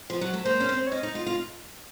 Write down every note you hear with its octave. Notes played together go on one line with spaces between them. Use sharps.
F3
F#3
A3
A#3 C5
C#4
C4
C#5
C#4 D#5
D#4
F4
F4